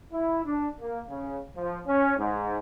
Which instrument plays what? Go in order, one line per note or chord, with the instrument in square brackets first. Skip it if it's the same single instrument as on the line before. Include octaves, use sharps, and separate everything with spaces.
[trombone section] E4
D4
A#3
C#3
F3
C#4
G#2